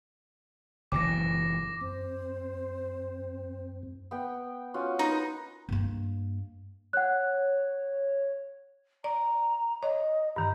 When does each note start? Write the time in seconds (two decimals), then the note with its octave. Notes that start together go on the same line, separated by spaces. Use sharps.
0.92 F#1 B2 E3 D6 A#6
1.81 F#2 C4 C5
4.11 B3 G5
4.74 C#4 F4 F#4
4.99 B3 D#4 A#4 B4
5.69 G2 A#3
6.93 C#5 F#5 F#6
9.04 D5 A#5
9.83 C#5 D#5
10.36 G2 D#3 A#5